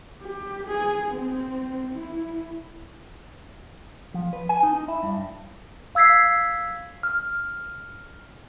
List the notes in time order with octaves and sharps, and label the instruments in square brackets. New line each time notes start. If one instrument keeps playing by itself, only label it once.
[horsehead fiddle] G4
G#4
C4
E4
[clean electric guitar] F3
B4
G#5
D#4
D#4
E4
G2
[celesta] F5 E6 G#6 B6 C7
F6